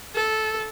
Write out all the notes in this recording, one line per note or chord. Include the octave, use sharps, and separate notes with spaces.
A4